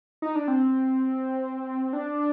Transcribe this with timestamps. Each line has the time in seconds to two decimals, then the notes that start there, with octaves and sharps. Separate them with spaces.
0.22 D#4
0.35 D4
0.48 C4
1.93 D4